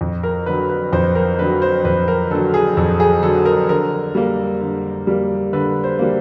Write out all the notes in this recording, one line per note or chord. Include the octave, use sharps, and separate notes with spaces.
F2
A#4
D3 F#3 B4
B4
F2 C5
A#4
D3 F#3 B4
C5
F2 B4
A#4
D3 F#3 A4
G#4
F2 A4
G#4
D3 F#3 A4
A#4
D3 A#4
G3 A#3
D3
G3 A#3
D3 B4
C5
G3 A#3